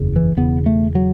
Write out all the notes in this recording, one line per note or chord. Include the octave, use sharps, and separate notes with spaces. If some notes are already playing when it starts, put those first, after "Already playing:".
Already playing: F#1 E2 C#3
E3
E1 E2 C#3 B3
A3
F#3